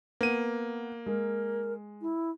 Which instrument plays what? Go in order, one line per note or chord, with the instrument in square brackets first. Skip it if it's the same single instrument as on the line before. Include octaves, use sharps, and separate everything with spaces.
[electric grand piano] A#3 D#7 [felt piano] B3
[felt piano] G#3 [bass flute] A#4
[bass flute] E4